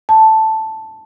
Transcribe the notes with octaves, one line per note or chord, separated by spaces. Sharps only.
A5